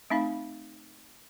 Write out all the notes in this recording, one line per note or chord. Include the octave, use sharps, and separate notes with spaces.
A3 C4 D#4 F5 B5